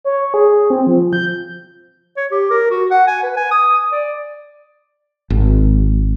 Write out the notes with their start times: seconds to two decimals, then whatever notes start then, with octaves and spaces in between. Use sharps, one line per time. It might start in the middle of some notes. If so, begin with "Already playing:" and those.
0.05 C#5
0.34 G#4
0.70 C4
0.87 F3
1.13 G6
2.17 C#5
2.32 G4
2.51 A#4
2.71 F#4
2.91 F#5
3.08 G#5
3.23 B4
3.37 G#5
3.51 D#6
3.92 D5
5.30 G#1